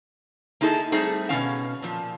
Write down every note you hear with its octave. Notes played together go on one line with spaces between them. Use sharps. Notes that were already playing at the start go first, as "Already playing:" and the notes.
A#3 D#4 E4 G#4 A4
G3 A3 C4 D#4 G#4
B2 E3 C#4 F5
A#2 F3